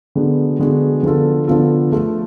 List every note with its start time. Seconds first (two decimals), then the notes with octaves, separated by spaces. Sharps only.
0.15 D3 G#3 B3 F#4
0.59 D3 G#3 B3 F#4
1.03 D3 F3 B3 F4 A4
1.47 D3 F3 B3 F4 A4
1.92 F3 A3 F4 A4